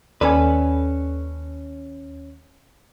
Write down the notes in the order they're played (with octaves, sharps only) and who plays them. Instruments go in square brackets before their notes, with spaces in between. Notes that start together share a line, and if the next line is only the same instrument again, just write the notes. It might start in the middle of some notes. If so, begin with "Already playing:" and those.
[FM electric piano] D#2 [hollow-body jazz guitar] C#4 A4 B4 [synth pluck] D5 G#5